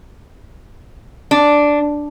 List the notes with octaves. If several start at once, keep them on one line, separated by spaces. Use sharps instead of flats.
D4